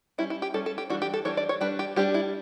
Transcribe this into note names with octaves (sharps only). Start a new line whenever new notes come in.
G3 C#4 E4
E4
G4
G3 C#4 A4
A4
G4
E3 G3 D4 F#4
G4
A4
E3 G3 D4 C#5
D5
C#5
G3 D4 B4
G4
G3 D4 G4
E4